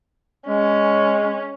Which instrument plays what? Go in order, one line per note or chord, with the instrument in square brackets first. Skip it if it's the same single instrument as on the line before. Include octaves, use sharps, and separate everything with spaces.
[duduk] G#3 [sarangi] C#4